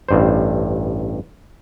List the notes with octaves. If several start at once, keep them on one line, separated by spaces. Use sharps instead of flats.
A1 G2 C5